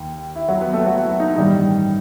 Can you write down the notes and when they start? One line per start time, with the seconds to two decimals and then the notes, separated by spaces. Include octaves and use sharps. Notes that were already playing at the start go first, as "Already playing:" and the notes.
Already playing: D#2 D#3
0.36 E4
0.48 F#3 F#4
0.61 B3 B4
0.73 A3 A4
0.86 F#3 F#4
1.03 E4
1.20 D#4
1.36 A1 G2 D#3 G3 D#4